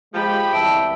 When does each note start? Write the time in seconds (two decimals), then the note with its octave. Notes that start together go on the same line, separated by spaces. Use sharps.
0.14 F3 G#3 G4 G5 B5
0.53 C2 E3 E5 A5 E6 D7